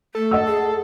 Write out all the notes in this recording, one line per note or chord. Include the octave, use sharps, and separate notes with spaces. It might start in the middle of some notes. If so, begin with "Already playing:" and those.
A3 A4
D#5 F#5 E6
G#4